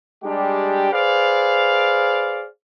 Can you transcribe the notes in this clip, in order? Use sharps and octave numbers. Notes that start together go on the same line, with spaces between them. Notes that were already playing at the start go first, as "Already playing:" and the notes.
G3 G#3 D4 G4
G#4 B4 C5 D5 F5